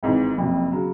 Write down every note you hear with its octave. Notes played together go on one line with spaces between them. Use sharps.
G#1 G#2 E3
F#1 F2 C3
C#3 F#3